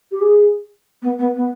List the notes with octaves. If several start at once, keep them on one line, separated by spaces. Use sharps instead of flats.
G4
G#4
B3
B3
B3